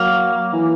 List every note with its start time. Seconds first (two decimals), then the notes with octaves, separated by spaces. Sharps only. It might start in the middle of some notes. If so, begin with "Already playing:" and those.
Already playing: F#3 A#3
0.53 E3